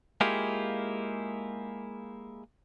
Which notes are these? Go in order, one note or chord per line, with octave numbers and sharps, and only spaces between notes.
G#3 A#3 E4 F4 G4 G#4